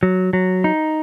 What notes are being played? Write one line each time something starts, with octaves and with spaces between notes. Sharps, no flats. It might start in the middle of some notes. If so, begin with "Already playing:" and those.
F#3
F#3
D#4